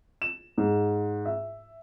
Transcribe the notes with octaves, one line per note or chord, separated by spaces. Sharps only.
E7
G#2
E5